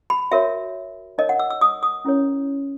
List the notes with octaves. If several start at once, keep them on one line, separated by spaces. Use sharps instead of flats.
B5
F#4 A#4 C#5 E5
D#4 A#4 C#5 D#5
F#5
E6
E6
D#6
D#6
C#4 E4 A#4 C#5